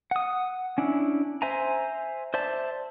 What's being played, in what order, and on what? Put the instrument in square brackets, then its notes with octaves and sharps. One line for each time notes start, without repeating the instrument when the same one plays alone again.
[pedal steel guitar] F#5 D#6
C#4 D4 E4
C5 E5 G#5 A#5
C5 D5 E5 A5